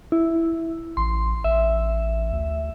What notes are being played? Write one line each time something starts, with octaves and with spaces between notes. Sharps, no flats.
E4
A1 C6
A1 E5
D2